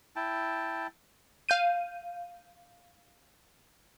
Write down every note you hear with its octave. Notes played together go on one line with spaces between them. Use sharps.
E4 G5 A5
F5 G6 D#7